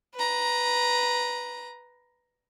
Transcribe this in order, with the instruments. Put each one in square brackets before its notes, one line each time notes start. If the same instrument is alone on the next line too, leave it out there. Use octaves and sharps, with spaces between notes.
[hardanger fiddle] B4 A#5